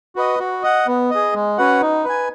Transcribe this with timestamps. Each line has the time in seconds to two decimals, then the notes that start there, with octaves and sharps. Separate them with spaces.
0.16 F#4 B4 D#5
0.39 F#4
0.63 D#5 F#5
0.87 B3
1.10 G#4 D#5
1.34 G#3
1.58 C#4 F#4 B4 F#5
1.82 D#4
2.05 B4 G#5